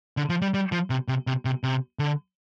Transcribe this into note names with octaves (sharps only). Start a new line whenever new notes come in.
D3
F3
G3
G3
F3
C3
C3
C3
C3
C3
D3